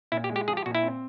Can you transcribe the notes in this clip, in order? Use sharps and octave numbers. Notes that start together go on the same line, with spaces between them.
A#2 E4
G4
G#3
G4
F3 G#4
G4
A#2 F#4
E4
C4